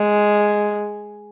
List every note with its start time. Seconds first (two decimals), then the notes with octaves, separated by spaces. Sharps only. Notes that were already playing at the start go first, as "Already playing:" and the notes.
Already playing: G#3